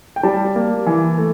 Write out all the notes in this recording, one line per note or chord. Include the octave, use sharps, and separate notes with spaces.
G5
G3 A5
A#3
E3
A3